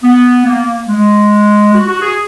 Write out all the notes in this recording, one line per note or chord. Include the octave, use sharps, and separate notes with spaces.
B3
A#3
G#3
F#4
F#4
G#4